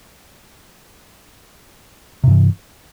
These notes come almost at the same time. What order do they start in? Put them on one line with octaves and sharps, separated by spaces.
C3 G2 E3